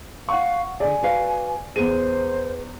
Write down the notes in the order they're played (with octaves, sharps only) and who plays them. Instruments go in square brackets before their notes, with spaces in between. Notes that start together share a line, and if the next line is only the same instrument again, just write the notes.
[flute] F5 [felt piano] F#5 C#6
[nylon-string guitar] D3 G#4 [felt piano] D5 [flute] G#5
[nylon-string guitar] F#4 B4 F5
[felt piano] E2 D#7 [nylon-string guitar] G#4 B4 [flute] C5